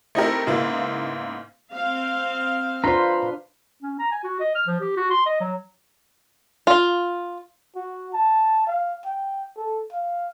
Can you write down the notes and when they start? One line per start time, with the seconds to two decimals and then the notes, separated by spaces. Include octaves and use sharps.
0.15 A3 C4 D#4 E4 G4 A#4
0.47 G#2 C#3 A#3 B3 E4
1.73 C4 F5
2.84 D4 F4 B4 C5 F5 A#5 C6
3.82 C#4
3.99 A#5
4.12 G#5
4.24 F#4
4.40 D#5
4.55 F6
4.67 F3
4.81 G4
4.97 F#4
5.10 C6
5.26 D#5
5.41 F#3
6.67 F4
7.76 F#4
8.14 A5
8.67 F5
9.05 G5
9.57 A4
9.92 F5